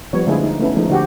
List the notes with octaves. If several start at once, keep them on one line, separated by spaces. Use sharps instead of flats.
F3 G3 B3 C#5
D3 G#3 A3 E4 F4 G#4
D#4
A3 B3 C#4 D#4 E4
F3 G#3 A3 D#4
D3 F#4 G4